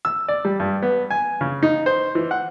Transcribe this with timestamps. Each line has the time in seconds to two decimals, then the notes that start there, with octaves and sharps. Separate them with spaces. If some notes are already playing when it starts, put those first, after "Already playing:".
0.05 E6
0.28 D5
0.45 G3
0.60 G2
0.82 B3
1.10 G#5
1.41 C#3
1.63 D#4
1.86 C5
2.15 E3
2.31 F#5